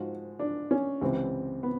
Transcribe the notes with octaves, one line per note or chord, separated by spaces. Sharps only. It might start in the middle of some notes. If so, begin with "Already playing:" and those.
Already playing: G#2 F3 F#4
D4
C#4
C#2 C3 E3 C4
B3